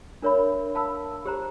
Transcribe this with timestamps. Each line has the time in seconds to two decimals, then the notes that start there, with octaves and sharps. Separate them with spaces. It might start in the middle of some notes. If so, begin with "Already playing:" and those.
0.22 D4 A#4 C#5 E5 B5
0.75 F5 A5 B5 E6
1.25 G4 C5 A#5